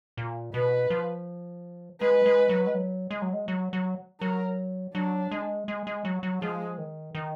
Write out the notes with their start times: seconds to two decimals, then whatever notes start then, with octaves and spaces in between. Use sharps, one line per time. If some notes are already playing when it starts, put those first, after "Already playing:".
0.17 A#2
0.54 B2 B4
0.90 F3
2.01 G#3 B4
2.26 G#3
2.49 F#3
2.67 G#3
2.74 F#3
3.11 G#3
3.22 F#3
3.33 G#3
3.48 F#3
3.73 F#3
4.21 F#3 A#4
4.95 F#3 D4
5.31 G#3
5.68 G#3
5.87 G#3
6.05 F#3
6.23 F#3
6.42 F3 G#3
6.78 D#3
7.15 D#3